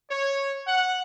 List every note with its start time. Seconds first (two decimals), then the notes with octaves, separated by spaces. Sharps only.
0.10 C#5
0.67 F#5